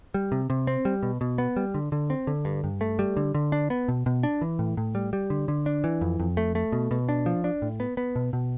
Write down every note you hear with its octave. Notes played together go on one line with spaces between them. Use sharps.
G3
C3
C3
C4
G3
B2
B2
B3
G3
D3
D3
C4
D3
G2
G2
A3
G3
D3
D3
D4
B3
B2
B2
D4
E3
A2
A2
G3
G3
D3
D3
D4
E3
F2
F2
A3
A3
B2
B2
D4
F3
D4
A2
B3
B3
B2
B2